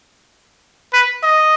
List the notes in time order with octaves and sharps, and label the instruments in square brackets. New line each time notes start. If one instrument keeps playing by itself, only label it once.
[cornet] B4
D#5